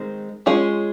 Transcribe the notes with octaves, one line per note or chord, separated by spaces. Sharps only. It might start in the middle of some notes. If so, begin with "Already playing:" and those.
Already playing: D#3 G#3 C4
G#3 C#4 F4 G#4 C#5